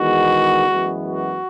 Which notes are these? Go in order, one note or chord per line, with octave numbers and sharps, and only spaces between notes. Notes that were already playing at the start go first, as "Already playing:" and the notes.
Already playing: E2 D#3 G#3 B3 F#4
F#2 E3 G#3 B3
F#4